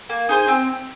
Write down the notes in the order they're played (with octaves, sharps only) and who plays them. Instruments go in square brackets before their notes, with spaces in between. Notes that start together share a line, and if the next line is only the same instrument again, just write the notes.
[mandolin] A#3
D#4 G#4 C5
C4